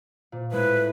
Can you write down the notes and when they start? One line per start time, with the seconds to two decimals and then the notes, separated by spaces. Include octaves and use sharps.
0.32 A#2
0.51 A2 G#3 E4 B4